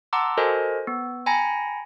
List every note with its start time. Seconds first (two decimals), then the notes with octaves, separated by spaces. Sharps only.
0.13 F#5 A5 A#5 C6 D6 E6
0.37 F#4 A4 A#4 C5 D#5 G#5
0.87 B3
1.26 G5 G#5 A#5 B5 A#6 C#7